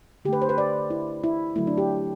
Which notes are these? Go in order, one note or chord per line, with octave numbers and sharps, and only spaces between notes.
D3 A3 G4 B4
C5
B4
D5
E4
E4
D3 F#3 A3 E4
D4
G4